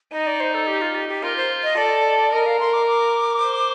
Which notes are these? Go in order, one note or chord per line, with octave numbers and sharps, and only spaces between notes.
D#4 D#5
D5
C5
A4
G4
F4
G4
G4
F4 A#4
C5
D#5
A4 D5
A#4 D#5
F5
C6
D6
D6
C5